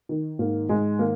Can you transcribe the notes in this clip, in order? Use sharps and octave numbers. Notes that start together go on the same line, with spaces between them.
D#3
G#2 A#3
G#2 G#3
D#3 A#3